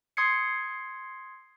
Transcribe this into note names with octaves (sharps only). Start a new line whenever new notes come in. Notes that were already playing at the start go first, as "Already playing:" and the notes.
C6 D#6 G#6 C7 C#7